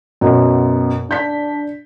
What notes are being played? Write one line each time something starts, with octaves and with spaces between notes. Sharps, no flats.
F#2 B2
D4 G6 B6